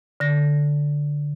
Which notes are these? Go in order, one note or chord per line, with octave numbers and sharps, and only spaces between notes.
D3 A#6